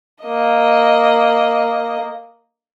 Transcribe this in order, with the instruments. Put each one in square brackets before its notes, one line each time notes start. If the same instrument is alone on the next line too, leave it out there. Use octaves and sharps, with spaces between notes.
[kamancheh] A#3 D#5